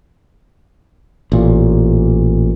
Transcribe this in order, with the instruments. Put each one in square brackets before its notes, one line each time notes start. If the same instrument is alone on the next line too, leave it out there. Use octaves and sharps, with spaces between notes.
[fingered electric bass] A1 A#2